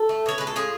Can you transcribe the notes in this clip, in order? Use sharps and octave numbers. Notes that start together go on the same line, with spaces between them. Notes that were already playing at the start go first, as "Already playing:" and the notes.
Already playing: A4
A3
B2 C#5
G#3 B4
A4
A2 F4 G#4